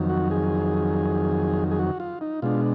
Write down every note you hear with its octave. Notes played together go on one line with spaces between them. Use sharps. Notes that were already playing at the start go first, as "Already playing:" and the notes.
Already playing: F2 D#3 F#3
F#4
G#4
G#4
F#4
F4
D#4
B2 G#3 D4 F4